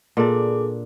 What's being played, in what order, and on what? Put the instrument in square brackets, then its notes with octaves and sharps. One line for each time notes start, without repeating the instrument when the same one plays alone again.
[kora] A#2 D4 [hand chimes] G#4 A4 D6